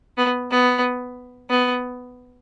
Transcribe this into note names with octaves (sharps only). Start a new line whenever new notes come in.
B3
B3
B3